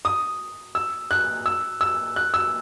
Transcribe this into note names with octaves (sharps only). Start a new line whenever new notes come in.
D#6
E6
F#6
E6
E6
F#6
E6